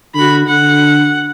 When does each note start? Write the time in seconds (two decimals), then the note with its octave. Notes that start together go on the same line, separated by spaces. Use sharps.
0.15 D3 F#4 B5
0.48 D3 F#5